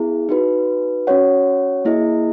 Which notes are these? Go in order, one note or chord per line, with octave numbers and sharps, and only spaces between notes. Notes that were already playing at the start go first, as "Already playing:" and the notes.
Already playing: B3 E4 G#4
D#4 F#4 B4
C#4 F#4 C#5 F#5
A#3 E4 G#4 D#5